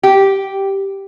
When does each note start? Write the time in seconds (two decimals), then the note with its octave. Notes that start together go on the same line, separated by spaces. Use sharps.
0.03 G4